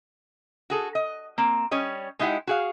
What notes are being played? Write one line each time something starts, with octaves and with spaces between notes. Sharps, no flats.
F#4 G#4 A4
D#5
A#3 C4
G3 C#4 C#5 D#5
G#3 D#4 E4 G4 F#5
F#4 G#4 F5